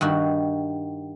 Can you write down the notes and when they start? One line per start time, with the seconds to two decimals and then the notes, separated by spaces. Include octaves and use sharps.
0.01 G2 D#3 F#4